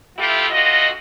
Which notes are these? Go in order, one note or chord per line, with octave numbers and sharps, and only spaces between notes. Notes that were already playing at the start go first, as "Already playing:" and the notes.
A3 E4 F4 G4
D2 F4 F#4 D#5